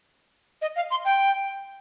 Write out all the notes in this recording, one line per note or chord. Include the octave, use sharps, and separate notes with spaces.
D#5
F5
C6
G5